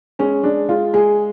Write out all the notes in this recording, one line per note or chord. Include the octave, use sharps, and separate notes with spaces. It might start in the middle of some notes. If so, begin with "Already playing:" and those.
G#3 C#4
G#3 D4
G#3 F4
G#3 G#4